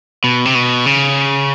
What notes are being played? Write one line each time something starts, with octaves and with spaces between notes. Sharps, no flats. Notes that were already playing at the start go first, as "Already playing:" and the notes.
B2
C3
B2
C#3